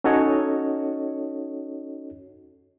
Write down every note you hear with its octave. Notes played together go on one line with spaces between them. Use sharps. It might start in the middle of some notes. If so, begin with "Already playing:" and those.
C#4 D#4 F#4 A4 C#5 D#5